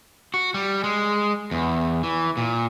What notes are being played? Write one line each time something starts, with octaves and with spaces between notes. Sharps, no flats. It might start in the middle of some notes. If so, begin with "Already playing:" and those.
F#4
G3
G#3
E2
E3
A#2